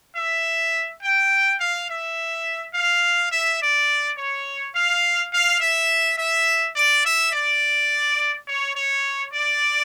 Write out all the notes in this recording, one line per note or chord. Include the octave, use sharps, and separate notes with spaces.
E5
G5
F5
E5
F5
E5
D5
C#5
F5
F5
E5
E5
D5
E5
D5
C#5
C#5
D5